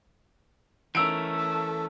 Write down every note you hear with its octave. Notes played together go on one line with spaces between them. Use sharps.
E3 A3 C#4 A#4 E6 D7
A4